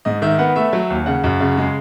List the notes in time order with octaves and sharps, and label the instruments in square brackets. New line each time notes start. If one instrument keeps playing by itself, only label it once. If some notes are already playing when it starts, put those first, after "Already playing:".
[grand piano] G#2 D#5
D#3 E5
B3 F#5
A3 E5
F#3
D#2
C#3 F#5
F#2
C#3
G#3